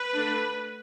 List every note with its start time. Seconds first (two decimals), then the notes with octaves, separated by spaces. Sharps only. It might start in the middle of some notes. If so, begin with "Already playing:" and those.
Already playing: B4
0.14 D3 A3 D4